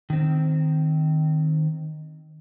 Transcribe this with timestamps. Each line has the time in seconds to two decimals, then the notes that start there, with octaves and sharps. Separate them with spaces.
0.10 D#3 C4